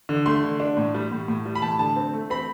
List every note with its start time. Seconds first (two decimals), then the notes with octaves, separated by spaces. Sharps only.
0.09 D3
0.26 A3 C6
0.44 D3
0.60 D4
0.77 A2
0.95 G3
1.12 A2
1.28 A2
1.45 G3
1.55 B5
1.62 A2 A5
1.79 D3 A5
1.96 C4
2.13 A3
2.30 C4 B5